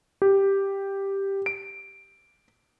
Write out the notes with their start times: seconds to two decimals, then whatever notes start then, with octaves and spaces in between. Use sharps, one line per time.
0.22 G4
1.46 D7